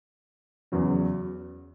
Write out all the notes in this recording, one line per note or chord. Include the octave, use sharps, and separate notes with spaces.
E2 C#3 F#3 C#4